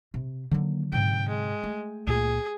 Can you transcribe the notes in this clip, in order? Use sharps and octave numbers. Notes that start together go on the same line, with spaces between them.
C3
D3 D#3 F#3 A#3
G#2 C3 G5
G#3
A3
C#2 A#2 G#4